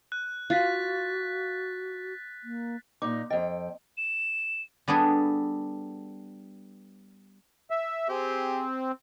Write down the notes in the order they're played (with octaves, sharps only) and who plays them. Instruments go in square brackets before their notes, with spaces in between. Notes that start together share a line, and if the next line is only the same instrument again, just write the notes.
[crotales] F#6
[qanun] F4 [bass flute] F#4 [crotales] F#6 A6 B6
[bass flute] A#3
[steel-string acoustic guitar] A#2 D#4 [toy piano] D6
[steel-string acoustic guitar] F2 G5 [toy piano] D#5
[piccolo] E7
[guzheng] G3 B3 D4 G#4 A4
[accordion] E5
[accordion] C4 [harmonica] G4 G#4